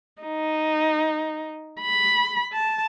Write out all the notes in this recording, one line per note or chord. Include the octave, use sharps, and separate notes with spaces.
D#4
B5
A5